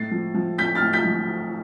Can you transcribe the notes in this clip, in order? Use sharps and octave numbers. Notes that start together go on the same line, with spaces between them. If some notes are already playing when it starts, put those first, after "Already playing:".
Already playing: A2 A6 C7
F3
F3
A2 G6 B6
F6 A6
A2
G6 B6
F3